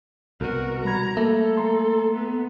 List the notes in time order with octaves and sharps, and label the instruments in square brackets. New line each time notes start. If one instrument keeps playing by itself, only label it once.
[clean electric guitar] C2 B2 [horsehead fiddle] F#4 A#4
[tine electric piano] G3 B5 G#6 [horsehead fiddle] A#5
[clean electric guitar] A3 [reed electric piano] A#3 [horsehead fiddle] A4
[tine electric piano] A#5 C6
[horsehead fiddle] B3